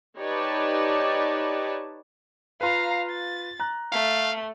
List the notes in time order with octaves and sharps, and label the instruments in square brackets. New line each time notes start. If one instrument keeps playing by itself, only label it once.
[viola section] D#4 G4 B4 C#5 D5 A5
[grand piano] F4 B4 [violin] F5 A#5
[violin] A6
[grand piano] A#5 F#6
[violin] A3 [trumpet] F5